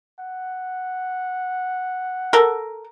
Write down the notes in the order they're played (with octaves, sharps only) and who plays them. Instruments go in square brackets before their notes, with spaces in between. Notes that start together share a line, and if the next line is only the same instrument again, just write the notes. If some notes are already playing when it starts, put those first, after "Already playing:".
[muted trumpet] F#5
[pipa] A4 A#4